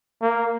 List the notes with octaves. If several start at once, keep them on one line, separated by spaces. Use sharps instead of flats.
A#3